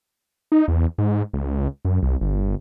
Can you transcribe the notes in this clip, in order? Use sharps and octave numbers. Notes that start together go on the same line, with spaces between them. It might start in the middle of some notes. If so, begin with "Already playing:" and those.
D#4
E2
G#2
C#2
F#2
C2
G1